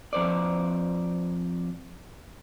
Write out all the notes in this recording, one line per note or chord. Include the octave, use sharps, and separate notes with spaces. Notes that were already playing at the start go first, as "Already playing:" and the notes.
F2 C5 D5